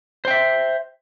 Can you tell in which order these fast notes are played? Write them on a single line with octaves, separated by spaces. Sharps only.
C5 G5 E5